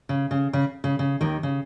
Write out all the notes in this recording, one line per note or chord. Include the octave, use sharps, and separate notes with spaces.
C#3
C#3
C#3
C#3
C#3
D#2 D#3
C#3